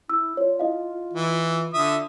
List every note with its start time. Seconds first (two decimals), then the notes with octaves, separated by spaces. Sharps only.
0.09 E4 E6
0.37 F4 C#5 D5
0.59 E4 D#5 F5
1.13 E3
1.74 D3 E5 D#6